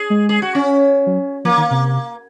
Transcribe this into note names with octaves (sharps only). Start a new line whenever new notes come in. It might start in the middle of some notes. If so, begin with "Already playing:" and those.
Already playing: G#4
G#3
G#4
F#4
C#4
F#3
F3 A#3
D#3
C3